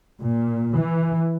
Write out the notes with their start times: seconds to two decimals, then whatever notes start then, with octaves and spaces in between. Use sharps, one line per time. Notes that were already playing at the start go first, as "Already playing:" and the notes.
0.20 A#2
0.76 E3